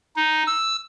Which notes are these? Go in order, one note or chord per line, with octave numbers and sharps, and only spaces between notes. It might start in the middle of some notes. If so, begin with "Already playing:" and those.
D#4
E6